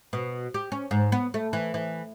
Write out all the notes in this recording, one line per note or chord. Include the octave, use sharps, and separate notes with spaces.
B2
G4
C#4
G#2
B3
A3
E3
E3